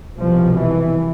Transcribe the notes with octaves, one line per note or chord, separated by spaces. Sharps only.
C2 B2 F3
E3